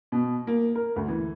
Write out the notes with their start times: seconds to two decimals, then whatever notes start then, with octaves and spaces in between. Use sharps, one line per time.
0.12 B2
0.47 A#3
0.75 A#4
0.96 D2
1.08 E3